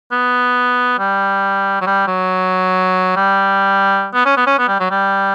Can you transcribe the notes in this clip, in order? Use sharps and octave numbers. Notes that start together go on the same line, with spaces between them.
B3
G3
F#3
G3
F#3
G3
B3
C#4
B3
C#4
B3
G3
F#3
G3